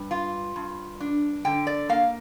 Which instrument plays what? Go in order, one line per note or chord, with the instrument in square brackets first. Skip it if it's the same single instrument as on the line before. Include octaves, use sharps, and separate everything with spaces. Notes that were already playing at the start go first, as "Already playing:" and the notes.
Already playing: [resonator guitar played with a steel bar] G2
F4
G2
D4
D3 G5
D5
A#3 F5